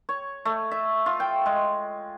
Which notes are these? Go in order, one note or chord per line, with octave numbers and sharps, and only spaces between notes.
C#5
A3
E5
F4
G5
G#3